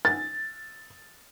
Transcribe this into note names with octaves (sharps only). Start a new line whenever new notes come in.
A6